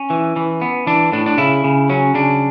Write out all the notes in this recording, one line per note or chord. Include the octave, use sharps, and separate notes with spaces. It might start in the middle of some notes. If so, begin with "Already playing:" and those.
Already playing: C#4
E3
E3
B3
E3 D4
A2 D4
D4
C#3 E4
C#3
F#3 C#4
C#3 D4